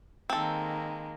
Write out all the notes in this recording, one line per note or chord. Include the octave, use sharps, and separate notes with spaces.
D#3 G#3 A#3 C4 A4